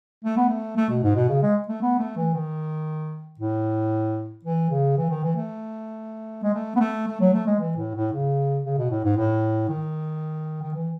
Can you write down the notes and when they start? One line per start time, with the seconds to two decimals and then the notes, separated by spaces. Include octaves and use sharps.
0.24 A3
0.37 B3
0.48 A3
0.77 A3
0.90 B2
1.03 G#2
1.15 B2
1.29 C#3
1.43 G#3
1.68 A3
1.82 B3
1.99 A3
2.17 E3
2.34 D#3
3.39 A2
4.44 E3
4.70 C#3
4.97 E3
5.10 D#3
5.23 E3
5.36 A3
6.43 G#3
6.54 A3
6.76 B3
6.80 A3
7.07 A3
7.20 F#3
7.33 A3
7.47 G#3
7.60 E3
7.77 A2
7.95 A2
8.12 C#3
8.65 C#3
8.78 B2
8.90 A2
9.04 G#2
9.17 A2
9.69 D#3
10.62 D#3
10.74 E3